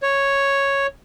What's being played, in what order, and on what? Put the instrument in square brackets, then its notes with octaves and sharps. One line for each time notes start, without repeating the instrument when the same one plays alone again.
[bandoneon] C#5